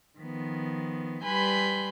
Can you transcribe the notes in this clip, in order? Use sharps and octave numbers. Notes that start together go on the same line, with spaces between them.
D#3 F3 B3
G3 B4 G#5 B5 C6 G6